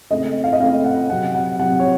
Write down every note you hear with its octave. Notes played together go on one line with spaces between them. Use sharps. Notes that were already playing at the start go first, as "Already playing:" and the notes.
C#3 A3 C4 D#5
F5
D#5
C#3 A3 C4 F5
F#5
C3 F#3 C4 F#5
F#5
C3 F#3 C4 F#5
C#5